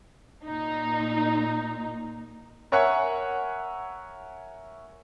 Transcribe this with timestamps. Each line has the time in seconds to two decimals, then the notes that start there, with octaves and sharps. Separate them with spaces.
0.46 A#2 D#4
2.72 A#4 C#5 E5 F#5 G#5 C#6